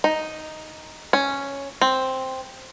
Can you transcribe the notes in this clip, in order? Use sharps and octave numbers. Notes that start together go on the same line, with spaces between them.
D#4
C#4
C4